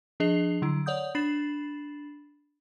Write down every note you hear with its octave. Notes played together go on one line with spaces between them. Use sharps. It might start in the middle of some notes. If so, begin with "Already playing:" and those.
F3 D4 G#4 D#5 C7 F7
D3 F#3 E4
C#5 D5 F#5 D#6 G6
D4 B5 A6 C7 E7 F#7